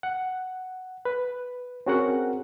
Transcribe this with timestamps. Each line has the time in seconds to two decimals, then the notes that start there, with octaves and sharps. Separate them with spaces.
0.03 F#5
1.05 B4
1.86 C4 C#4 F#4 G#4 A#4 F#5